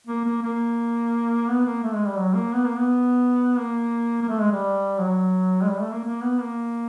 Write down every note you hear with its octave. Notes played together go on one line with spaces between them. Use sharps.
A#3
A#3
A#3
B3
A#3
A3
G#3
G3
F#3
A#3
B3
A#3
B3
A#3
A#3
A3
G#3
G3
F#3
G#3
G3
A3
A#3
A#3
B3
A#3